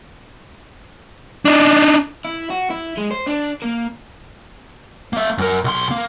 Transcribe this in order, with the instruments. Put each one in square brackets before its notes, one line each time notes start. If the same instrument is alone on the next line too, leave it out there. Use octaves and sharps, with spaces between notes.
[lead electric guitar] D4 D#4
[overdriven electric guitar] E4
F#4
E4
G#3
C5
D4
A#3
[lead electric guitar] A#3 E5
F#2 A#4
B1 C6
A#3